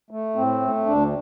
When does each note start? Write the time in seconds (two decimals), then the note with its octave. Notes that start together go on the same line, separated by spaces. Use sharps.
0.11 A3
0.35 A2 C4
0.61 A3
0.86 D2 D4